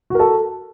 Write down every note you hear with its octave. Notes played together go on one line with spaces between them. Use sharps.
F#4 A4 A#4